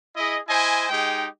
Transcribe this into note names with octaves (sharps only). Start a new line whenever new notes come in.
E4 G#4 D#5
E4 C5 D#5 G#5
G#3 D#4 G4 G#4 G5